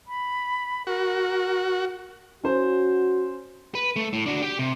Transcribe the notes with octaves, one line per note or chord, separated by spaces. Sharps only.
B5
F#4 A#4
C#4 F#4 C5
B4
A3
A2
D4 F#4
G4 G5
C3